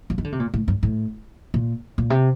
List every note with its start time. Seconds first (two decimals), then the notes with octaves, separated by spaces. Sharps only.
0.10 F3
0.18 D#3
0.24 D3
0.32 C3
0.40 A#2
0.54 A2
0.68 G2
0.83 A2
1.54 A#2
1.98 A#2
2.10 C3